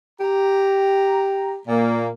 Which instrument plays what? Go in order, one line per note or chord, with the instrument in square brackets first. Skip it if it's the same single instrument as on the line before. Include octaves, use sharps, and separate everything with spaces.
[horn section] G4 A#5
A#2 A#3